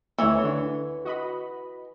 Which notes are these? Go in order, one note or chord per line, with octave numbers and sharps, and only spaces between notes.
D2 E3 A3 C#5
D3
F#4 D#5 B5